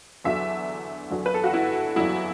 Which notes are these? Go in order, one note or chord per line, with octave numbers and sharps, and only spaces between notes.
E2 D3 F#3 E5
E2 D3 F#3
B4
A4
F#4
E4
E2 D3 F#3 E4